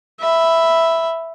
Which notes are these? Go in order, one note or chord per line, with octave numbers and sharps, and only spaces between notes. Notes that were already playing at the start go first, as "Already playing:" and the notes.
E5 B5